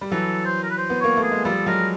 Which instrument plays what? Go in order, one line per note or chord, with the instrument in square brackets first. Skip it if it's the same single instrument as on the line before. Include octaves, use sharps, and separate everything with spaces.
[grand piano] G3
[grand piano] E3 F#3 [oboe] A4
[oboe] C5
A#4
B4
C5
[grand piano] B3
[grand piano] A#3 [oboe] C#5
[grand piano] A3
[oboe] G#4
[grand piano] G#3
[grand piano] F3 G3 [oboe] A4
[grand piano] F#3 G#3 [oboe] A#4